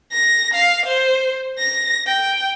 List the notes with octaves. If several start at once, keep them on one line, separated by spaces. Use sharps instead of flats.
A#6
F5
C5
A#6
G5